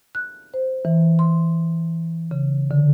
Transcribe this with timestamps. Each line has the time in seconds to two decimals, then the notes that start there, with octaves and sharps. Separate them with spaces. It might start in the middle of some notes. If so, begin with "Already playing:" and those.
0.15 F#6
0.54 C5
0.85 E3
1.19 C6
2.31 C#3
2.71 D3